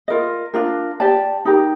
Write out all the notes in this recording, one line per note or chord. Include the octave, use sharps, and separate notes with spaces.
F4 A#4 D#5
D4 F4 A#4
G4 D5 A5
D#4 G4 A#4